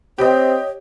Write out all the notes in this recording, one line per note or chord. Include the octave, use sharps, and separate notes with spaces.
C4 G4 C#5 D#5